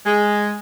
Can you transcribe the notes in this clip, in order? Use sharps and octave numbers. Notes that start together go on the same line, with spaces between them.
G#3